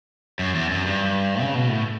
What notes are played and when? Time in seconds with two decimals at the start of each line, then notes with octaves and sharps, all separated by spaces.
0.39 F#2
0.55 E2
0.71 F#2
0.86 G2
1.41 C#3
1.55 B2
1.68 A2